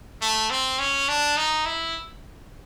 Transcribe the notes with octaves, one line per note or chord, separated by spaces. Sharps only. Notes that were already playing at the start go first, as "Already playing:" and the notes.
A3
C4
C#4
D4
D#4
E4